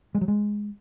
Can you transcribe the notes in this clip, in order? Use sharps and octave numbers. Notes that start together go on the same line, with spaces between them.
G#3
F#3
G#3